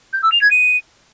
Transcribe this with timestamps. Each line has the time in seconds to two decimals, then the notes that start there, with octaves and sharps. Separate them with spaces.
0.13 G6
0.22 E6
0.32 F7
0.41 G#6
0.51 D#7